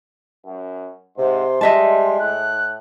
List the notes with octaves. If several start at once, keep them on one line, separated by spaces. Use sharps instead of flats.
F#2
G#2 C3 C6
G3 G#3 D#5 E5 A5
A2 F#6